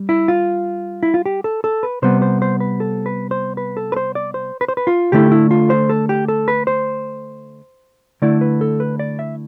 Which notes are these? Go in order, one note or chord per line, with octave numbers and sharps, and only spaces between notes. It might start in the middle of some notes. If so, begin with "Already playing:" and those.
Already playing: G3
E4
F4
E4
F4
G4
A4
A4
B4
C3 G3 B3 C5
C5
C5
B4
A4
B4
C5
B4
A4
B4
C5
D5
C5
B4
C5
B4
F4
D3 A3 E4 G4
E4
F4
C5
A4
G4
A4
B4
C5
D3 A3 E4 D5
B4
A4
B4
D5
E5